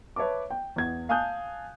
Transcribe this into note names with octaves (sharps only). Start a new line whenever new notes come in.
B4 C#5 E5 A5 D6
G5
E2 G#6
F5 G#5 A5 D#6 F#6 G6